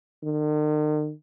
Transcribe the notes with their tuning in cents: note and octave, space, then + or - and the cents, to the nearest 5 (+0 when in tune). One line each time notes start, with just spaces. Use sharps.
D#3 -45